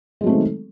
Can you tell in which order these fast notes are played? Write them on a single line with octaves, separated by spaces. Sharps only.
G#3 F#3 A3 C4 D#3